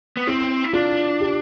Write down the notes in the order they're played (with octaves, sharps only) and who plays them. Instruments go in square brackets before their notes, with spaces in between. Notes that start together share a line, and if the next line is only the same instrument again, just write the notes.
[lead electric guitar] B3
[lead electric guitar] C4 [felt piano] E4
[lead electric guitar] E4
[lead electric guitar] D4 [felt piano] F4
[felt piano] G4